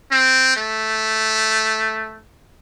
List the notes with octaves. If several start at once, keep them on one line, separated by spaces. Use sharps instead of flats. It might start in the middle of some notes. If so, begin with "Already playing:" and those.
C4
A3